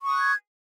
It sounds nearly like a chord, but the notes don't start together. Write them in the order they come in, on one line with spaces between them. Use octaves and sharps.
C#6 D#6 F#6 G#6